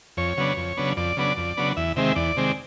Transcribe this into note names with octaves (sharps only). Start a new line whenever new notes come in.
F2 C#5
C#3 F#3 B3 D4
F2
C#3 F#3 B3 D4
F2 D5
C#3 F#3 B3 D4
F2
C#3 F#3 B3 D4
E2 E5
C3 D#3 G#3 C4 E5
E2 D5
C3 D#3 G#3 C4